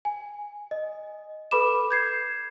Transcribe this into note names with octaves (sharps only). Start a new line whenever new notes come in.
G#5
D#5
A4 B4 B5 D6 E7
G6 G#6 C7